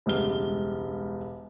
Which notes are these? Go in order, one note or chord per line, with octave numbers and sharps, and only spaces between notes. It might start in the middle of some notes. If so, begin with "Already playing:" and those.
E1 C#2 G3 F6 G7